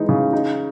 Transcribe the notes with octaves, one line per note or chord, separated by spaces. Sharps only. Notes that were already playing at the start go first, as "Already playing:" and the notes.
Already playing: E3 G#3 D#4
C#3
D#4